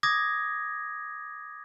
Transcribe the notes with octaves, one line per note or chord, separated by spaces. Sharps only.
D6 D#6 G#6 A#6